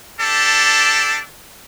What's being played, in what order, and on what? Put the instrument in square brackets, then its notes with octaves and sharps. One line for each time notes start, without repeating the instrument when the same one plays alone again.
[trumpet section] D4 G4 A4